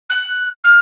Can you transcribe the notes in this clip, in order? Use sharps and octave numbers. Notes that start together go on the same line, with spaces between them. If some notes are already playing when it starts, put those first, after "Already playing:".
F#6
F6